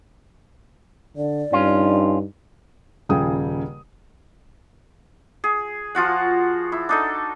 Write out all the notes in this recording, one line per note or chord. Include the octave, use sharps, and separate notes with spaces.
D3 D5
G2 C#4 D#4 F4
D#1 C#3 F3 G#4 G5 D#6
G#4
F3 F4 F#4 F#5
E4
D4 D#4 A4